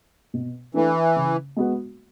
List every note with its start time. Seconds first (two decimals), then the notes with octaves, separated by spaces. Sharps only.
0.34 B2
0.74 E3 A3 D4
1.16 C#3
1.56 G#3 B3 F#4